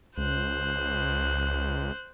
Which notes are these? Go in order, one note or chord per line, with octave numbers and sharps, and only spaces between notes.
C#2 C5 F#6